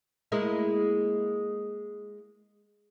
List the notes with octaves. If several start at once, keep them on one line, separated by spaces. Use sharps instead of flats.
G#3 A#3 E4